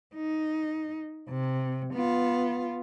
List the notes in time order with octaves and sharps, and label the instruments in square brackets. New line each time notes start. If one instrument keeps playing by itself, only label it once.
[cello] D#4
C3
B3 F4